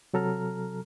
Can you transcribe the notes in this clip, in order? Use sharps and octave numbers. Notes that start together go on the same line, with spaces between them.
C3 F#3 A4 A#5 F6